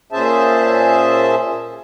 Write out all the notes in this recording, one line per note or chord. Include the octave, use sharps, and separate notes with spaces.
A#2 C#4 G#4 C5 E5 A5